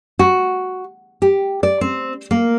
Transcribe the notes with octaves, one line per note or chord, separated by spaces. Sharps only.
F#4
G4
D5
C4
A#3